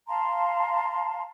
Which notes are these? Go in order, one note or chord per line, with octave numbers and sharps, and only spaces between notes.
F5 A5 A#5 C6